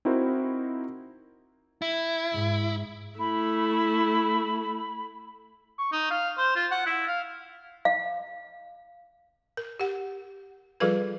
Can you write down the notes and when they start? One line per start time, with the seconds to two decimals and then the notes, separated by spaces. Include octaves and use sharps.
0.05 C4 D#4 E4 F#4 A#4 C5
1.82 E4
2.33 G#2
3.19 A3 E4 B5
5.79 C#6
5.92 D#4
6.11 F5
6.38 C5
6.56 F4
6.71 F#5
6.86 E4
7.08 F5
7.85 F5
9.57 A#4
9.80 G4 F#5
10.80 F3 G3 F4 G#4 A4 B4